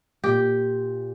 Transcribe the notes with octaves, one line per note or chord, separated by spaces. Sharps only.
A#2 G4